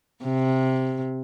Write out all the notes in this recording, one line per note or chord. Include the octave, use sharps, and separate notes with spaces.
C3